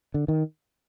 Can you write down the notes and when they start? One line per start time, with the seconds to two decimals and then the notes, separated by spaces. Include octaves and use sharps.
0.14 D3
0.28 D#3